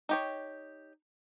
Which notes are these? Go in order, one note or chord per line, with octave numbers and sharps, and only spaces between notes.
D#4 G4 C#5